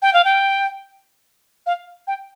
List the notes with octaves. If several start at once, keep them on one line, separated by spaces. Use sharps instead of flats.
G5
F5
G5
F5
G5